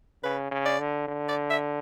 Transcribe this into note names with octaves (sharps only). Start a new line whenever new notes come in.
C#3 B4
C#3
D5
D3
D3
D5
E5